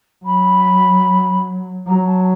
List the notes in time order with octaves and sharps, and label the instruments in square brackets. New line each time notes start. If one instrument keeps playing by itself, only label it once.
[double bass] F#3 [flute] B5
[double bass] F#3 [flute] A#5
[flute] A5